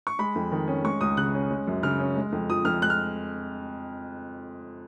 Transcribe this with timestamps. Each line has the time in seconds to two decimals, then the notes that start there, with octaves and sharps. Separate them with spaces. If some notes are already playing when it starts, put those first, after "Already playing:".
0.07 C#6
0.19 G#3 B5
0.36 F2
0.52 D#3
0.68 C#4
0.84 G#3 C#6
1.01 C#2 D#6
1.17 C#3 F#6
1.34 C#4
1.51 G#3
1.67 F#2
1.83 C#3 F6
2.00 C#4
2.16 G#3
2.32 F2
2.50 F3 D#6
2.65 F2 F6
2.82 G#3 F#6
2.90 F6